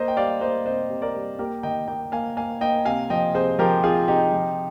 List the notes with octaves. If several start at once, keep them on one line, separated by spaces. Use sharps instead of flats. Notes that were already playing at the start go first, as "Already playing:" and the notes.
Already playing: A#3 C5 D#5
G5
G3 D5 F5
A#3 C5 D#5
C3 C5 D#5
C3
A#4 D5
G3
A#3 G4 A#4
D#3 D#5 G5
A#3 D#5 G5
A#3 F5 G#5
A#3 F5 G#5
A#3 D#5 G5
C3 F5 G#5
F3 D#5 G5
C3 G#4 C5
F3 G4 A#4
C3 F4 G#4
C3 D#4 G4
F3